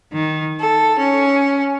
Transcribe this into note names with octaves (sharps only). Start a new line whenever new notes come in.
D#3
A4
C#4